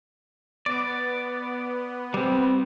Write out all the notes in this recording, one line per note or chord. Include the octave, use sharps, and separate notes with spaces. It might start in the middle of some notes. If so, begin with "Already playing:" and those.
B3 D5
G3 C4